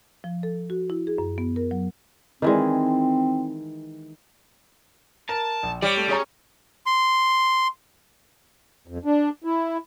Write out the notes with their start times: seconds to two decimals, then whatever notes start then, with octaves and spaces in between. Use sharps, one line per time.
0.24 F3
0.43 A4
0.70 F#4
0.90 E4
1.07 G#4
1.18 F#2
1.38 B3
1.56 A#4
1.71 F#3
2.42 D#3 E3 G#3 C4
5.29 A#4 A5
5.63 A#1
5.82 G3 G4 C#5 D5 C#7
5.97 A3
6.09 C#4 G#4 C#5 A#5
6.86 C6
8.87 F2
9.05 D4
9.44 E4